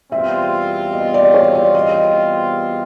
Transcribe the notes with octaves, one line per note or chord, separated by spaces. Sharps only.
E2 B2 G3 C4 F4 E5
D#5
D5
C#5
D5
D#5